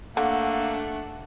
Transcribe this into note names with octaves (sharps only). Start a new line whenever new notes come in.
D3 A3 A#3 D4 F#5